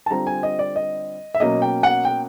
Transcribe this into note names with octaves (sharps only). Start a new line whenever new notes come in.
A5
D3 G3 C4 F4 A#5
G#5
D#5
D5
D#5
E5
B2 F#3 A#3 C#4 D#5
G5
F#5
G5